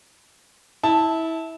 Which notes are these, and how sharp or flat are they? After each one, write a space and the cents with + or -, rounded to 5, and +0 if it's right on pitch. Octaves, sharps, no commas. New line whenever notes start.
E4 -20 A5 +0